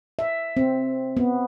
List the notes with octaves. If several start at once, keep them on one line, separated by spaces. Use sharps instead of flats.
E5
C4
B3